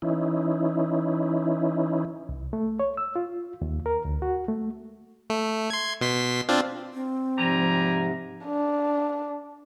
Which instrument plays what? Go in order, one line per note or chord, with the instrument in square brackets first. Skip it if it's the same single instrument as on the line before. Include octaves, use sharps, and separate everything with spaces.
[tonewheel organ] E3 C#4 D#4 E4
[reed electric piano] C2
A3
C#5
E6
F4
D#2
A#4
D2
F#4
A3
[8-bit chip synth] A3
C6 G#6
B2 C6 B6
C4 D4 F4
[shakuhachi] C4
[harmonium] G#2 C3 [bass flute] F3 [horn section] G3 G#5 A#5
[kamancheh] D4